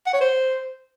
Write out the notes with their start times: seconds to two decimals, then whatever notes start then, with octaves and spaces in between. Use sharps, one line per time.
0.06 F#5
0.13 C#5
0.21 C5